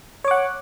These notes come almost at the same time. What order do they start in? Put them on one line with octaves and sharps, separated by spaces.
C#5 D6 F#5